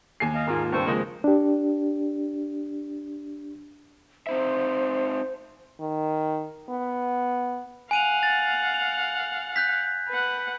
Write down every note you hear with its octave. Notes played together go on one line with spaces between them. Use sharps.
D#2 G#5 C7
D#5 F5
G#2 A#3 F4 G#4 A#4
G2 C4 B4 C5 G5 C#6 E6
F3 G#3 A#3
D4 G4
C4 D#4 C5 E5
D#3
B3
F5 F#5 G#5 D#7 F7
A6
F7
F#6 G6 B6
B4 F#5